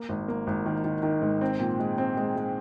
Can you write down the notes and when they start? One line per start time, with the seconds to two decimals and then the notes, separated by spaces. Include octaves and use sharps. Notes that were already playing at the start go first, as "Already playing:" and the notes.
Already playing: A#3
0.09 G#1
0.28 A#3
0.47 G#1
0.66 D#3
0.84 D#3
1.03 D#3
1.22 G#2
1.41 C4
1.60 A#2
1.80 G#3
1.98 C4
2.17 G#3
2.36 G#3